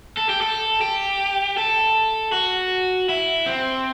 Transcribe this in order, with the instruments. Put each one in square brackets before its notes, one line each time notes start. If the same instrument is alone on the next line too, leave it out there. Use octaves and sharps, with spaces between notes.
[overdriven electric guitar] A4
G4
A4
G4
A4
F#4
E4
C4